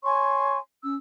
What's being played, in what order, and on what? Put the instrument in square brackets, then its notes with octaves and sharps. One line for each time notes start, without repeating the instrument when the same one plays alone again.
[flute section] C#5 G#5 C6 C#6
C#4 E6